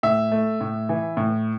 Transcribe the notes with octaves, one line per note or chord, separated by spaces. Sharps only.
A2 E5
A3
A2
E3
A2